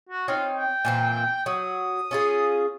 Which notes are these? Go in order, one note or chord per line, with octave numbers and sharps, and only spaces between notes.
F#4
C4 D#4 F4 C#5
G5
A#2 E3 C4
F#3 D#6
C#4 F4 G#4